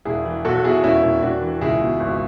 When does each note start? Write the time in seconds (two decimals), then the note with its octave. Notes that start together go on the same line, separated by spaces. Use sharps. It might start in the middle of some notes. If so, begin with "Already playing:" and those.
0.05 E1 E4 G#4
0.25 E3
0.45 B1 F#4 A4
0.64 B2 E4 G#4
0.83 E1 C#4 E4
1.03 E1
1.22 E1 D4 F#4
1.42 E3
1.61 C#2 E4 G#4
1.81 B2
2.00 G#1